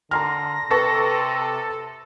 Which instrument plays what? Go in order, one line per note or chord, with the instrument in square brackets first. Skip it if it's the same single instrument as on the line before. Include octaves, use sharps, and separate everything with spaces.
[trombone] D3 [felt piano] A#5 C6 F6 [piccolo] A#6
[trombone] C3 [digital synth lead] A4 [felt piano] B4 A5 C#6